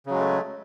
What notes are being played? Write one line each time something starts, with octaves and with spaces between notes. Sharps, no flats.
C#3 F#3 G#3 A3